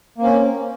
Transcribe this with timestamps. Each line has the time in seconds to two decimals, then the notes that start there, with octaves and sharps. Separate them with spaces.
0.18 A#3
0.21 C4
0.24 C#4